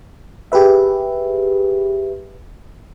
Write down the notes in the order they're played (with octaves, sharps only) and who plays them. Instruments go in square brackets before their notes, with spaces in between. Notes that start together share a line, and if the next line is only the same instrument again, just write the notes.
[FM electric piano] G4 G#4 B4 E5